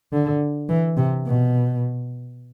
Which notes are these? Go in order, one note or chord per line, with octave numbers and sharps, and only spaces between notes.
D3
E3
C3
B2